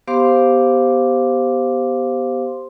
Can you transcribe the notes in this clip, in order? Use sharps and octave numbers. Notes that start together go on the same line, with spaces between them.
B3 G4 C5 F5 C6 D6